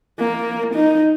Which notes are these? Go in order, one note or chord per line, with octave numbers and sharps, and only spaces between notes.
A#3
D#4